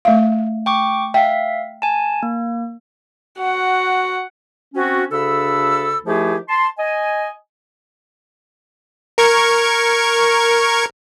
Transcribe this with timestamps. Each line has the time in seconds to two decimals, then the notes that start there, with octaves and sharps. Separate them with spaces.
0.05 A3 E5 F5
0.66 G5 C#6 D6
1.14 E5 F5 G5
1.82 G#5 A5
2.23 A#3
3.39 F#4 F#5
4.75 C4 C#4 F#4
5.12 D2 C#3 D4 A4 B5 E6
6.05 D#3 F3 A3 E4 G4 G#4
6.49 A5 C6
6.78 D#5 G#5
9.18 A#4 C#6 G#6